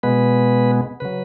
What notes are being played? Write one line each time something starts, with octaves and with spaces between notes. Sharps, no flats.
B2 G#3 B3 B4
C#3 F#3 B4